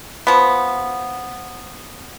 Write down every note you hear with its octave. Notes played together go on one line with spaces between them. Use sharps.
F3 B3